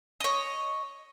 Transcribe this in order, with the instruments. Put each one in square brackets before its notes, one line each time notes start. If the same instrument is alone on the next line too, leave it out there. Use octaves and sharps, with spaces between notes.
[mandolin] C#5 D#5